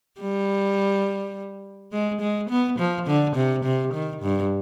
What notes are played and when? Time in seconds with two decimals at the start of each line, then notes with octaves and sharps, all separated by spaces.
0.20 G3
1.92 G#3
2.21 G#3
2.50 B3
2.79 F3
3.07 D3
3.36 C3
3.64 C3
3.93 D#3
4.22 G2